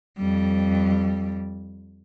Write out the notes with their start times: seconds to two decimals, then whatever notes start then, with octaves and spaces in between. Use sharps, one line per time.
0.18 F2 G3